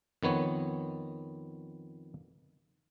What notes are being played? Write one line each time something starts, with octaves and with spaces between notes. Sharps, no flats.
F2 D#3 B3 C#5